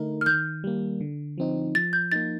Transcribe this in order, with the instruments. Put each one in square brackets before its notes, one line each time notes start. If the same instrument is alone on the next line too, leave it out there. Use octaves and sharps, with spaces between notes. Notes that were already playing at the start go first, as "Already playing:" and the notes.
Already playing: [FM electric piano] D3 A3 D#4 A#4
[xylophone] F6
[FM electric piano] D#3 [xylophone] G6
[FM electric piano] G3 A#3
D3
F3 C4 D#4
[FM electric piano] F3 [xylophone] A6
[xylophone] G6
[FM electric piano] A#3 D#4 [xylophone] A6